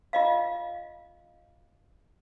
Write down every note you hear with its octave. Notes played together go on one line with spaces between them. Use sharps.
F4 D#5 F5